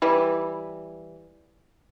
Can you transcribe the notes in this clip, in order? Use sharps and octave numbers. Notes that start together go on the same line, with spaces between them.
E3 G3